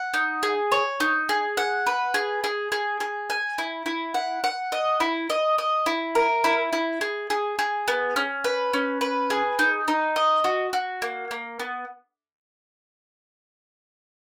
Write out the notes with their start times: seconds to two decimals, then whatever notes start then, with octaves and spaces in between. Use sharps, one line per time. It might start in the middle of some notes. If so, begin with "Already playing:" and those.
Already playing: F#5
0.14 D#4
0.43 G#4
0.72 C#5
1.00 D#4
1.29 G#4
1.57 F#5
1.87 B4
2.14 G#4
2.44 G#4
2.72 G#4
3.00 G#4
3.30 G#5
3.58 E4
3.86 E4
4.14 F#5
4.44 F#5
4.72 D#5
5.00 E4
5.30 D#5
5.58 D#5
5.86 E4
6.15 A#4
6.44 E4
6.73 E4
7.01 G#4
7.30 G#4
7.59 G#4
7.88 B3
8.16 C#4
8.44 B4
8.73 C#4
9.01 B4
9.30 G#4
9.59 D#4
9.88 D#4
10.16 D#5
10.44 F#4
10.73 F#4
11.02 A#3
11.31 A#3
11.60 B3